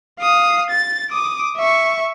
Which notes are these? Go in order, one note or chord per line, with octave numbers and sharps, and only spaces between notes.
F5 D#6
A6
D6 D#6
E5 C#6